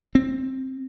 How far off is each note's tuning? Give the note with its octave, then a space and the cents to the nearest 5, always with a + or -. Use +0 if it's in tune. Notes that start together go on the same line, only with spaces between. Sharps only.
C4 +10